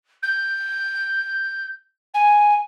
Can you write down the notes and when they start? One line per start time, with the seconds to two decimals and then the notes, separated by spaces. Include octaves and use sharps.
0.23 G6
2.14 G#5